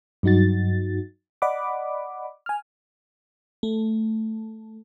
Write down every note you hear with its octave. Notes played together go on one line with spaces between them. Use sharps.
G2 F#3 D#4 F#4 A6
D5 D#5 F#5 B5 D6
G#5 F6
A3